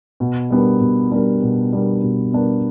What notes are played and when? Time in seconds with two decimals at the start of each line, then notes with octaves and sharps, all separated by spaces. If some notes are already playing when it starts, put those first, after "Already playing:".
0.20 B2
0.50 G3 B3 D4 A#4
0.81 B2
1.12 G3 B3 D4 A#4
1.42 B2
1.73 G3 B3 D4 A#4
2.03 B2
2.32 G3 B3 D4 A#4